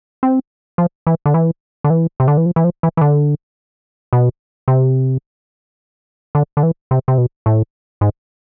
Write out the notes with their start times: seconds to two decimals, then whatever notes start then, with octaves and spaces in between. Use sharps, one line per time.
0.23 C4
0.78 F3
1.07 E3
1.26 D3
1.34 E3
1.84 D3
1.90 E3
2.20 C3
2.28 D3
2.37 E3
2.46 F3
2.56 E3
2.64 F3
2.83 E3
2.97 E3
3.01 D3
4.13 B2
4.68 C3
6.35 D3
6.57 D3
6.63 E3
6.91 C3
7.08 C3
7.18 B2
7.46 A2
8.01 G#2